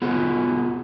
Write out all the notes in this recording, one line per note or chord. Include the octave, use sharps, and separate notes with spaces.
B3 F4 F#4 G#4